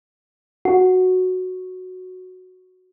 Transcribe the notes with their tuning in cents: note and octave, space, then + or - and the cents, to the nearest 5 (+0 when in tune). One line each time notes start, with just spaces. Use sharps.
F#4 -5